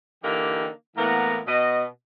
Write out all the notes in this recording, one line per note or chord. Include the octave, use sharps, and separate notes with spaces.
D3 E3 A#3 D#4 G4
A2 E3 A#3 B3 F#5 A#5
B2 D#5